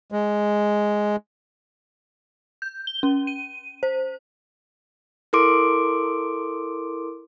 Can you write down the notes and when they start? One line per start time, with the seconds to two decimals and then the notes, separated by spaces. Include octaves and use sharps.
0.12 G#3
2.62 G6
2.87 G7
3.03 C#4
3.27 D#7
3.83 C5
5.33 E4 A4 A#4 C6 D6 D7